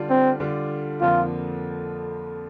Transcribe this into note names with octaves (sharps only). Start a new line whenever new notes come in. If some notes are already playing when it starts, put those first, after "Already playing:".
Already playing: D3 G3 D4 F4
C4
D3 G3 D4 F4
F2 D3 F3 A#3 F4